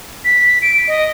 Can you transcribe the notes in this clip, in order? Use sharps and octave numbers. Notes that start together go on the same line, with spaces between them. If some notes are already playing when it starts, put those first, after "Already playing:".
B6
D7
D#5